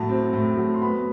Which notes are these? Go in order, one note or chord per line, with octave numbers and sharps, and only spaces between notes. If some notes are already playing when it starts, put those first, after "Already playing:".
Already playing: A2 F#3 A5
C4
A2
F#3
C6
B3 B5